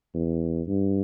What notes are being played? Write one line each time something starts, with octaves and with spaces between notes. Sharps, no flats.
E2
G2